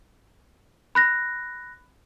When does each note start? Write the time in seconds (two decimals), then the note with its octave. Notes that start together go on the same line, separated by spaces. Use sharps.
0.95 B5 F#6 A#6